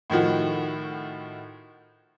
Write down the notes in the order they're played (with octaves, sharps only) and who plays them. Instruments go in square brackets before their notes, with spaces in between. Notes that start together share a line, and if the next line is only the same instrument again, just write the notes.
[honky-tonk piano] A2 D#3 F3 F#4